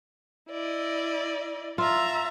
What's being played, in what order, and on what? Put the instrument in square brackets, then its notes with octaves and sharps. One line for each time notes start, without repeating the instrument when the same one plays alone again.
[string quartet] E4 D5 D#5
[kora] F4 [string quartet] E5 A5 A#5